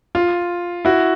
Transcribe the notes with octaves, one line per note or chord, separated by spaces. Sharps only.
F4
E4 F#4